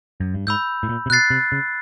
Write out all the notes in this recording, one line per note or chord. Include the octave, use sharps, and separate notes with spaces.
F#2
G2
G#2 B5 E6 G6
A2
A#2
C3
B2 F#6 A6 C7
C3
C#3